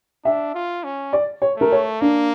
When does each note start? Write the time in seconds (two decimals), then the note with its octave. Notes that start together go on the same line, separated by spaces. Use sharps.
0.25 D4 E5
0.55 F4
0.84 C#4
1.13 D5
1.42 C#5
1.57 A3 A#4
1.72 C#5
2.01 A#3 D4